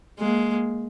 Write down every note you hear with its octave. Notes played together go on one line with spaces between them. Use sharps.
G#3 A#3